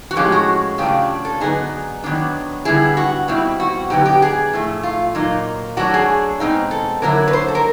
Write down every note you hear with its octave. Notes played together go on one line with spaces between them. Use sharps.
F#4
A2 F3 G#3 C#4 G4
F#4
C#3 F#3 A3 D4 F4 G4
A4
D3 F#3 B3 D#4 G#4
D#3 F#3 B3 D4
D3 G3 B3 E4 G#4
F#4
B2 G3 C4 E4
F#4
D3 F#3 B3 D#4 G4
G4
G#4
A2 F3 A3
F4
A#2 F#3 A#3 D#4
F#3 A3 D4 F#4
G#4
B2 G#3 C4 D#4
A4
D3 F#3 A#3 C#4 E4 A#4
B4
C5
A4
A#4